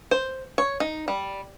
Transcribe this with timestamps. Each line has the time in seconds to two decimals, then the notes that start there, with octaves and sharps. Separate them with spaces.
0.11 C5
0.58 C#5
0.80 D#4
1.08 G3